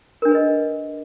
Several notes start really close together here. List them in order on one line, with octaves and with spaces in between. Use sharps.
A#4 D4 G#4 B4 D#5